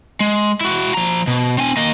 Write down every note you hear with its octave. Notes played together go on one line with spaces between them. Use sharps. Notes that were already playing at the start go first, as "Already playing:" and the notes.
G#3
E4 F#4
F3 A#5
B2
C4 G#5
A#3 D#5